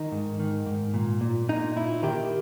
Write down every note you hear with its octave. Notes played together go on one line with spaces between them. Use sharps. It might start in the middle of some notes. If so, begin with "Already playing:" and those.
Already playing: D#3 D#4
G#2
D#3
G#2
A#2
A#2
A#2 D#4
A#2 E4
D#3 G4